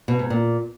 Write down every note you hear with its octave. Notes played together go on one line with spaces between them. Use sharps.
B2
G#2
A#2